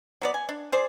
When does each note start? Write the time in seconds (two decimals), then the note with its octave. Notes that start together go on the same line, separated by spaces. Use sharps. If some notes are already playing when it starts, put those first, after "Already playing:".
0.22 F#3 B3 D5
0.34 G#5
0.49 D4
0.72 G#4 C5 D5